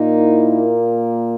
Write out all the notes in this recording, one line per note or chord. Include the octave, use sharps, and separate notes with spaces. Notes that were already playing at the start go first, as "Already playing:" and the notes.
Already playing: A#2 A#3 D#4
E4